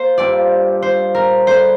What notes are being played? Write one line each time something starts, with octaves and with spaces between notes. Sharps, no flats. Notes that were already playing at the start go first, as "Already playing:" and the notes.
Already playing: A#3 C5
G2 F3 C4 G4 D5
C5
A#4
G2 D3 G3 C5